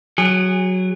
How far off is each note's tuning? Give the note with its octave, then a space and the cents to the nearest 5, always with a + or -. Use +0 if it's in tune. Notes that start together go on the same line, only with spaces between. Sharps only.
F#3 +0 G#4 -25